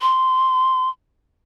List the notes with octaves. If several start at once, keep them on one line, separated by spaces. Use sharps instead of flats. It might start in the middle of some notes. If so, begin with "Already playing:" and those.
C6